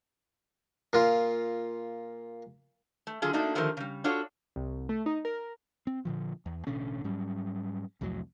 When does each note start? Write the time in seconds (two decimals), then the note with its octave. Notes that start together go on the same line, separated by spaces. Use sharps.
0.93 A#2 F4
3.07 A3
3.22 D3 F#3 F4 G#4
3.33 A3 A#3 D4 D#4 F#4
3.55 D3 D#3 F3 A3 G4 A#4
3.77 C#3 G3
4.04 D4 F4 F#4 A4 C#5
4.56 C2
4.89 A3
5.06 D#4
5.25 A#4
5.87 C4
6.05 A#2 D3 F3
6.46 E2
6.67 A1 B2 D3 C#4
7.04 G#2 F#3 G3 C#4
8.01 C2 F2 A2 F#3